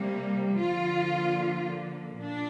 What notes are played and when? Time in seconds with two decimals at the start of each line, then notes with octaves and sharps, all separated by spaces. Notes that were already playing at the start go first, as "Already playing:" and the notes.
Already playing: C3 G3 A#3
0.57 D3 F3 A#3 F4
2.19 A#2 D4